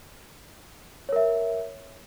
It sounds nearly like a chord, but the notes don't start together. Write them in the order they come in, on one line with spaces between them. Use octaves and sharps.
C#5 A#4 E5